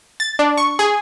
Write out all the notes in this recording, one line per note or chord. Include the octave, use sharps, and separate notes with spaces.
A6
D4
C#6
G#4